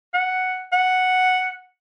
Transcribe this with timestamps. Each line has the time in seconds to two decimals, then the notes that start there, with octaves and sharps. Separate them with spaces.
0.14 F#5
0.72 F#5